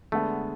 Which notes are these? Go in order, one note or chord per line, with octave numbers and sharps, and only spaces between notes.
D3 G#3 A3 B3 D4